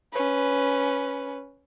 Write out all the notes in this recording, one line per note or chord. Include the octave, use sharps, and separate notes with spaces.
C#4 B4